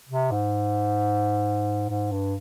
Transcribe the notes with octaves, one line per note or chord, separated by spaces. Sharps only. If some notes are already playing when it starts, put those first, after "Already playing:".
C3
G#2
G#2
G2